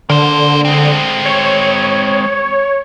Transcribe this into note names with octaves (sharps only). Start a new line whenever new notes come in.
D3 A#3 C5
G#3 C4
C#5